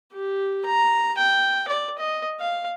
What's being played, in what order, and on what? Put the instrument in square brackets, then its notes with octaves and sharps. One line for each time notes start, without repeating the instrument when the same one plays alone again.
[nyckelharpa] G4
A#5
G5
D5
D#5
F5